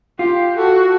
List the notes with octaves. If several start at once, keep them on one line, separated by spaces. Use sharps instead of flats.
F4 G4
F#4 A4